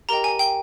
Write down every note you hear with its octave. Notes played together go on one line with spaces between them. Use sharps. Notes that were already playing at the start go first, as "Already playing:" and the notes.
G4 A#4 D#5 G5 A#5
G#5
G5